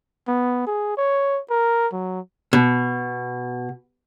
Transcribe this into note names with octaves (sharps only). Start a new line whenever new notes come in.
B3
G#4
C#5
A#4
F#3
B2